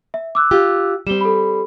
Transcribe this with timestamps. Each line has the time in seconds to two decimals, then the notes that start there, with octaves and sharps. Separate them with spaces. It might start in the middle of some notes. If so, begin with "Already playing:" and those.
0.14 E5
0.35 D6 E6 F#6
0.51 F4 G4
1.07 G3 C4 E7 G7
1.21 A4 B5